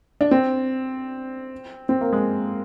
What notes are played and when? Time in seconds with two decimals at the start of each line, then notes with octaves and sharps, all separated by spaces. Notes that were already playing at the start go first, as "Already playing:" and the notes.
0.21 D4
0.31 C4
1.89 C4
2.01 A#3
2.13 G#3